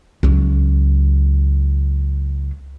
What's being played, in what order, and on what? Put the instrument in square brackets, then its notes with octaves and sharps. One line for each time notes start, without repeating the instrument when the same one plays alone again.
[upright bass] C#2 F#3